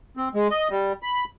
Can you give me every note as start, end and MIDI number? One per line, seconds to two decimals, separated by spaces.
0.17 0.29 60
0.35 0.48 56
0.51 0.68 75
0.70 0.92 55
1.03 1.24 83